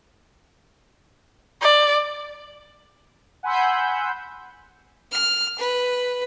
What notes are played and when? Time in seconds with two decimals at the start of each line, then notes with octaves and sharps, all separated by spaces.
1.61 D5
3.43 F#5 G#5 B5 C6 E6 G6
5.12 F6
5.59 B4